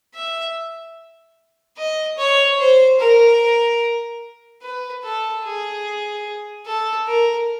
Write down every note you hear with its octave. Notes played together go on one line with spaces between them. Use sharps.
E5
D#5
C#5
C5
A#4
B4
A4
G#4
A4
A#4